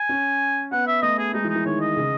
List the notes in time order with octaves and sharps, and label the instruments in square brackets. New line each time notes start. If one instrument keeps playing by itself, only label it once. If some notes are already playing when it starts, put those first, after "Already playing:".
Already playing: [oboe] G#5
[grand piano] C#4
[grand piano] B3 [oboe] F#5
[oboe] E5
[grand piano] A3 [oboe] D#5
[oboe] G#4
[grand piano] G#3 [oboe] D#4
[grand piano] E3
[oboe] D#4
[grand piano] E3
[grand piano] D#3 [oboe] C#5
[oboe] D#5
[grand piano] C#3